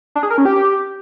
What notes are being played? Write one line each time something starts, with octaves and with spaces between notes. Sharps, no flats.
D4
G#4
A#4
C#4
G4